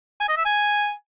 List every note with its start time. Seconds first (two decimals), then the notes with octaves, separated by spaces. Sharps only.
0.20 G#5
0.29 D#5
0.37 E5
0.45 G#5